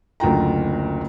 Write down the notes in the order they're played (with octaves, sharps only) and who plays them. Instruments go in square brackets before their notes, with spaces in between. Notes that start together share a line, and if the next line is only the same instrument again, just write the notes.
[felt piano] F#1 D2 F4 G5 A#5